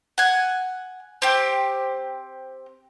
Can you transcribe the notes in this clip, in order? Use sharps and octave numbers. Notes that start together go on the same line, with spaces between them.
F#5 G#5
C4 G4